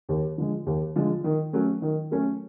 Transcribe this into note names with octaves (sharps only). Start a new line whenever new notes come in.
D#2
D3 F3 G#3
D#2
D3 F3 G#3
D#3
F#3 A3 C#4
D#3
F#3 A3 C#4